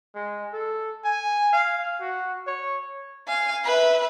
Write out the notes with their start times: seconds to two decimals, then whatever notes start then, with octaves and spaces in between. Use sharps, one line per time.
0.15 G#3
0.53 A4
1.05 G#5
1.53 F5
2.01 F#4
2.47 C#5
3.28 F5 G#5
3.64 B4 E5